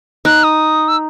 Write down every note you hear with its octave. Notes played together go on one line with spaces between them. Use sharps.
D#4 F#6
D#6
E6